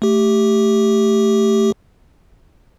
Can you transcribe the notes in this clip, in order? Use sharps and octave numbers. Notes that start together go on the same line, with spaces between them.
A3 G4